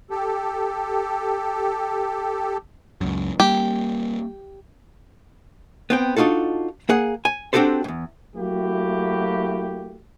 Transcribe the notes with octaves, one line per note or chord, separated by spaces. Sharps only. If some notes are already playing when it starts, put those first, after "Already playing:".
G4 A4
C#2 F#2
G3 A#3 G4
B3 C4 G5
D4 D#4 F4 F#4 A4
A#3 G#4 F#5
G#5
C4 D4 F#4 G4 A4 C5
E2 G#2
F#3 A3 A#3 E4 F#4 G4